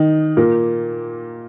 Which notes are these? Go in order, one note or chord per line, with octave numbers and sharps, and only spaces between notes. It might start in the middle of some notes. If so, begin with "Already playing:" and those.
Already playing: D#3 D#4
A#2 A#3